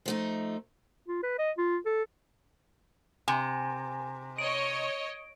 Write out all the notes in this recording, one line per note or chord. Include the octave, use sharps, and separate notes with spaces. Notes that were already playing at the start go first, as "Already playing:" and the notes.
F3 A3 D#4
F4
B4
D#5
F4
A4
C3 G#5
C#5 D#5 D7